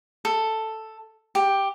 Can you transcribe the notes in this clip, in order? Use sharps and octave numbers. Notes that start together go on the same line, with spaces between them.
A4
G4